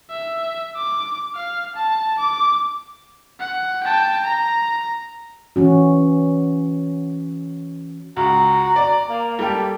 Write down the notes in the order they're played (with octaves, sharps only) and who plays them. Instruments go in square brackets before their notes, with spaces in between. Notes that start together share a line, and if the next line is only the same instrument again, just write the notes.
[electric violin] E5
D6
F5
A5
D6
F#5
G5 A5
A#5
[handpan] E3 C#4 F#4
[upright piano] C#2 [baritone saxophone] F#4 [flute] A#5
[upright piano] D5
[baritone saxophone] A#3 [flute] F5
[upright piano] G3 G4 [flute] A4